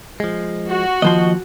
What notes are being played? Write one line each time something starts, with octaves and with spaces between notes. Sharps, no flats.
F3 G#3
F#4
D#2 F3 D#5 C6